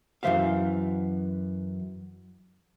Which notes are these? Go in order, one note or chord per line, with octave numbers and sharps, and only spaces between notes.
F#2 E3 F3 C5 E5 F5